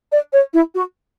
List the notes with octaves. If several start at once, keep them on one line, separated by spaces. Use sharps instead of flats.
D5
C#5
E4
F#4